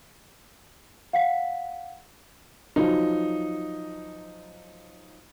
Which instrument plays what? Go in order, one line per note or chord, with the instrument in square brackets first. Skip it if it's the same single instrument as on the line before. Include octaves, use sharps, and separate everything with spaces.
[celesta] F5 F#5 B6
[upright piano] F3 F#3 D#4